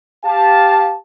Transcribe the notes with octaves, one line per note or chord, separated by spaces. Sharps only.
G4 F5 A5